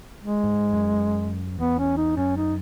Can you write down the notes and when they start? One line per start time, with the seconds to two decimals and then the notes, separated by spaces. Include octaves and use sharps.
0.24 G#3
0.44 G#2
0.73 F#2
1.59 E2 B3
1.79 C#4
1.97 D#4
2.17 F#2 C#4
2.37 D#4